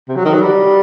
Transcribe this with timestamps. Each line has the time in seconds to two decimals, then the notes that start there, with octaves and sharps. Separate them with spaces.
0.09 C3
0.16 F#3
0.25 D#3
0.34 F#3
0.42 G3